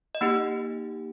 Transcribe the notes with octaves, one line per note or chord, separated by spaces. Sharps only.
D#5
A#3 D#4 G4 F#5